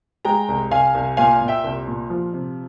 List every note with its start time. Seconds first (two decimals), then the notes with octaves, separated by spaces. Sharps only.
0.25 G#3 G5 A#5
0.49 C2
0.71 C2 F5 G#5
0.95 C2
1.17 A#2 F5 G#5
1.41 A#2
1.48 E5 G5
1.64 C2
1.87 A#2
2.10 F3
2.33 C3